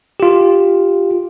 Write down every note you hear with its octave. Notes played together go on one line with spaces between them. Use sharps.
F4 G4